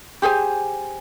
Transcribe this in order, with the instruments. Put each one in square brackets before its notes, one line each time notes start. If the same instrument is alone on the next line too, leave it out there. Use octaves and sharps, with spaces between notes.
[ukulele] G4 G#4 C5 G#5